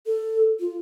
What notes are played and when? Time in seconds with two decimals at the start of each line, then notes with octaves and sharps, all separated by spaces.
0.06 A4
0.60 F4